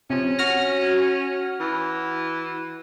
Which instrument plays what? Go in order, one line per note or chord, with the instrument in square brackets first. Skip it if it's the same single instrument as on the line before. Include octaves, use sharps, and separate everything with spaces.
[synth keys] C3 F3 [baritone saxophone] C#4
[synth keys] F#4 F6 A#6
[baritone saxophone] E3